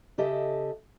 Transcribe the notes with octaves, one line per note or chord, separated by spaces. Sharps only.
C#3 G4 A4 D#5 E5